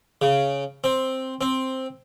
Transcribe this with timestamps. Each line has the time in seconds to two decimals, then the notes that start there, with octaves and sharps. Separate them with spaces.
0.22 C#3
0.84 C4
1.41 C4